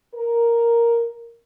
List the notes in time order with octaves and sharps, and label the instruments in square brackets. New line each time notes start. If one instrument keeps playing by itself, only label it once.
[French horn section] A#4